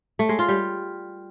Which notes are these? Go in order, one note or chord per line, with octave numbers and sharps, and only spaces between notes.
A3
G#3
F4
G3